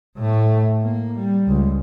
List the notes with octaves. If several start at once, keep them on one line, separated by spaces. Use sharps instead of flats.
A2 A3
A#3
G3
C#2